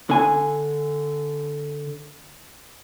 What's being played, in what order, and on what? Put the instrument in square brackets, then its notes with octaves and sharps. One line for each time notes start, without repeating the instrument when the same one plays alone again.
[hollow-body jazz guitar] D3 G#5